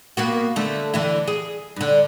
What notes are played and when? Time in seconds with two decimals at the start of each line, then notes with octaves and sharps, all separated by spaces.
0.17 A#3 B3 F#4
0.56 D3 A3
0.94 D3 E3 E4
1.27 G#4
1.76 G2 D3